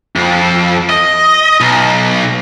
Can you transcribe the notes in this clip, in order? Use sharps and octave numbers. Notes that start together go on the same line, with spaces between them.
F2
D#5
B1